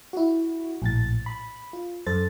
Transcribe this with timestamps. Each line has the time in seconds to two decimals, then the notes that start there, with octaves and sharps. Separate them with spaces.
0.13 E4 F#4
0.82 A#1 A2 A6
1.26 B5
1.73 F4
2.06 F#2 A4 C5 A6